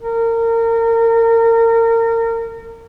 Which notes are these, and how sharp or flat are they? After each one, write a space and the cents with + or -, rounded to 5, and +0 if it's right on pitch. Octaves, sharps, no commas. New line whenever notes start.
A#4 -30